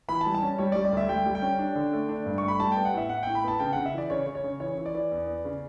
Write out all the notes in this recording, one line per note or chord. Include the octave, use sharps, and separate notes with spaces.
E3 B5
A5
G3
A5
C#4
G3 C#5
G3 D5
D5
D2 E5
G3 G5
G3
G5
C#4
D4
D3
A3
D4
G2
A3 C#6
B5
G3 A5
B3 G5
F#5
A2 E5
A2 F#5
A2 G5
B5
B3 A5
C#3 G5
C#3 F#5
E5
E3 D5
C#3 C#5
C#3
C#5
C#3
E3 C#5
E3
D5
E3
E2
B3
C#3